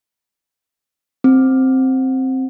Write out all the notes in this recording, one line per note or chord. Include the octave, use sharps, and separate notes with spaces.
C4